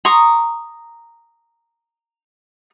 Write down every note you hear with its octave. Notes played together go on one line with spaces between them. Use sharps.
A#5 C6 C#6 D#6